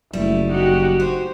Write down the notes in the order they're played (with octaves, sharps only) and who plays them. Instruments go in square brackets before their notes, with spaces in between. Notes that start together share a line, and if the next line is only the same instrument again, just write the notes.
[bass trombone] F#1 [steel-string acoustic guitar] G3 [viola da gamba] A3 E4
[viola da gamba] D#4 G4 [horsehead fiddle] F#4 F#5
[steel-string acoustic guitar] F#4 [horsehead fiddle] C5